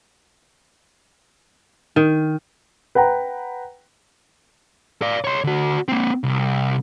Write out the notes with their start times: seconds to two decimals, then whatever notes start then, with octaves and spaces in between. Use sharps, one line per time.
1.96 D#3
2.95 B4 F#5 G5 A#5
5.02 D5 F5
5.24 C#5 C6
5.44 D3 F#4
5.88 A#3 C4
6.24 C2